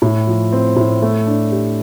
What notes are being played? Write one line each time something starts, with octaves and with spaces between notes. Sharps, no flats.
A2
F3
C4
A2
A3
D4
G4